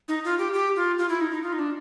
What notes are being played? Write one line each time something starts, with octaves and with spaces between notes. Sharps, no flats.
D#4
F4
G4
G4
F4
F4
E4
D#4
D#4
F4
D#4
D4